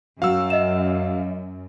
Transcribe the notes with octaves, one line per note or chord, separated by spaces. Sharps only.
F#2 F#3 F#4 F5 E6
D#5 E5 E7